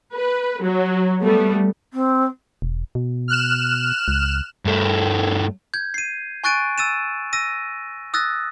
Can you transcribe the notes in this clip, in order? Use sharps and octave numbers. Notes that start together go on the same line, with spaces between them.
B4
F#3
G3 A3 B3
C4
E1
B2
F6 F#6 E7
C#2
G2 A3
G6 G#6
C7 D#7
G#5 C#6 F#6 A6 D7 D#7
E6 A6 D#7 E7
E6 A#6 D#7
D#6 E6 F#6 A6 A#6